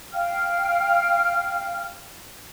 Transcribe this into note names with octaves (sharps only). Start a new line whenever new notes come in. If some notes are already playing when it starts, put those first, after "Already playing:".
F5 G5 F6